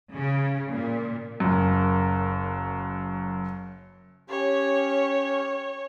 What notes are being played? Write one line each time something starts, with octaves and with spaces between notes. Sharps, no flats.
C#3
A#2
F#1 F#2
C#4 G4 C#5